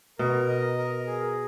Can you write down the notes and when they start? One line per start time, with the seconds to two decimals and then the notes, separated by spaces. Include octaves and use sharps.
0.19 B2 A#4
0.48 D#5
0.78 A#4
1.07 G#4